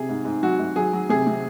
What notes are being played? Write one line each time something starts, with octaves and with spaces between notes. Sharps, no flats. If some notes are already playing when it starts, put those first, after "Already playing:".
Already playing: C3 G#4
G#2
G#2
F#3 F#4
G#2
F#3 G#4
F#3
C3 G#4
C3